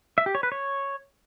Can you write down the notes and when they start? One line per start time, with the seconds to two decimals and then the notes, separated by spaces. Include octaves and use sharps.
0.18 E5
0.26 G4
0.35 C#5
0.43 B4
0.52 C#5